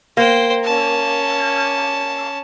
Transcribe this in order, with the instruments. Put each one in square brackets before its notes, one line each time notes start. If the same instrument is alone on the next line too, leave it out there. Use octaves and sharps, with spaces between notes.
[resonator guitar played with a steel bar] A#3 [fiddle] C5 G5
[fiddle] C#4 A5